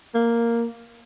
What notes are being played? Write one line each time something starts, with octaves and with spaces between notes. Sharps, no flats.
A#3